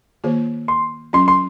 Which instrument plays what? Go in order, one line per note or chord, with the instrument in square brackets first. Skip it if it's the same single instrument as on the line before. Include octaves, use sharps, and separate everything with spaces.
[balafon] D#3 A#3 F4 G#4 C5
[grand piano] C6
[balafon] F#3 C#4 F4 [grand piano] C6
[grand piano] C6